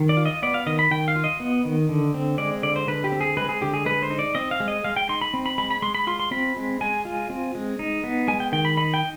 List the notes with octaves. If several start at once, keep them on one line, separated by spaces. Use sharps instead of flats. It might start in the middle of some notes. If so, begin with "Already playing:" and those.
Already playing: D#3
D5
F4
D#5
B3 D5
F5
D#3 D#5
B5
D#3 G5
F5
F4
D#5
B3
D#3
D3
C4
G#3 D5
D3 D5
C5
D3 B4
G4
C4
G#4
G#3 B4
G#4
D3 G4
G#4
G#3 B4
C5
D#4
D5
C4 D#5
F5
G#3
D#5
G#3 F5
G5
D#4 C6
B5
C4
B5
G#3 B5
B5
G#3 C6
B5
F4 C6
C6
C4 B5
G#3
G#3 G#5
F4
C4
G#3
D#4
B3
G#3 G#5
G5
D#3 G5
B5
D#4 B5
G5